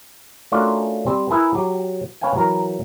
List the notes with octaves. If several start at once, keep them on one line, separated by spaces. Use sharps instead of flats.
A3 C#4 D4 F4 F#4 A#4
G3 C4
E4 G#4 A#4 B4
F#3 G4 G5
C#4 B4 F5 G5 G#5
E3 F#3 A#4 A#5